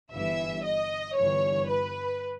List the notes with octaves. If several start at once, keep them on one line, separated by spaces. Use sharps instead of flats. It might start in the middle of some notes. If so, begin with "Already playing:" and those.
G1 G2 E3 E5
D#5
G1 G2 E3 C#5
B4